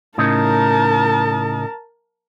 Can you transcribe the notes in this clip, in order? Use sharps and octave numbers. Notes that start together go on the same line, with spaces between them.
A2 C#3 D#4 A#4 A5